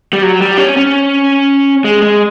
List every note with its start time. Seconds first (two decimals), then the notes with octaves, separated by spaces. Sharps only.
0.13 G3
0.22 F#3
0.41 G3
0.57 C#4
0.77 C#4
1.84 G#3
2.02 G#3